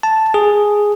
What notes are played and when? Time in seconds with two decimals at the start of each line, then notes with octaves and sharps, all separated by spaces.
0.03 A5
0.34 G#4